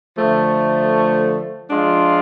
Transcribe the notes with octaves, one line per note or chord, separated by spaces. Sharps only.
D3 F3 A3
F3 G#3 D4 F4